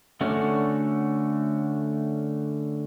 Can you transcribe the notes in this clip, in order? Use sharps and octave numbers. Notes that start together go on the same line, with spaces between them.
D3 A3 C#4 D4 F#4